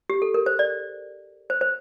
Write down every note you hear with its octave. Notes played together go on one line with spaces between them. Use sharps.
G4
A4
A#4
C5
D5
C5
C5